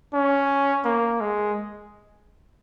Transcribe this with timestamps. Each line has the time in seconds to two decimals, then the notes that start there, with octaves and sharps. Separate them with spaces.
0.13 C#4
0.85 A#3
1.21 G#3